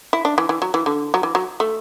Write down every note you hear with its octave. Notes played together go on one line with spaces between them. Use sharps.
E4
D4
E3
E3
F#3
E3
D3
F#3
E3
F#3
A3